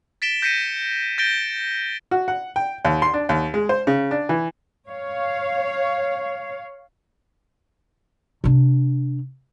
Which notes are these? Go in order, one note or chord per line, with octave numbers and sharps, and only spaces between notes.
A6 B6 D7 E7 G7
G6 A#6 B6 C#7 D#7
G6 A6 A#6 D7 G7
F#4
F#5
G5
D#2
C6
D4
D#2
G#3
C5
C#3
D4
E3
C#5 F5
C3 D4